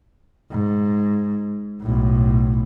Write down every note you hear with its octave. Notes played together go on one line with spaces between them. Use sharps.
G#2
B1 A2